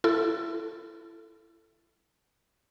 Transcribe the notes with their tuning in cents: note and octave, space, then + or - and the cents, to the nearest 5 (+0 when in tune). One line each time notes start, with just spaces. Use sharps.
E4 +25 A4 +0